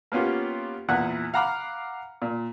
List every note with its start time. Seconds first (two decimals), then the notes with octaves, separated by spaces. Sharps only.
0.12 A#3 B3 C#4 F4 G4
0.89 E2 A#2 E3 E4 F#5 F#6
1.34 F5 F#5 A#5 B5 D6 F6
2.22 A#2